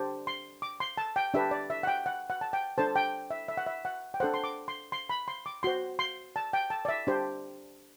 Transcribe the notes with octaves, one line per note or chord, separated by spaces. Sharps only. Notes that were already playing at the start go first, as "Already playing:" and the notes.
Already playing: D4 G4 C5
C6
D6
C6
A5
G5
D4 G4 B4 E5
D5
E5
F#5
G5
F#5
F#5
A5
G5
D4 A4 C5 A5
G5
E5
E5
F#5
E5
F#5
G5
D4 A4 C5 F#5
C6
D6
C6
C6
B5
C6
D6
F#4 C5 C6
C6
A5
G5
A5
D5
E5
D4 G4 C5